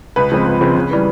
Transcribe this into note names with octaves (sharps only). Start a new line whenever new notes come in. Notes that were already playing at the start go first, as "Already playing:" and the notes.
C#2 B4
C#3 F3 G#3 C4
C#2
C#3 F3 G#3 C4
C#3
E3 G3